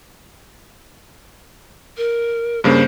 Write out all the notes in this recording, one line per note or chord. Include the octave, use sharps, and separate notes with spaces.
A#4
G2 C#3 A#3 C5